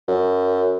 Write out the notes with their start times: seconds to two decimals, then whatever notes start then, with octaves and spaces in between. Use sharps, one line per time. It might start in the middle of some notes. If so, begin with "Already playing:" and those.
0.08 F#2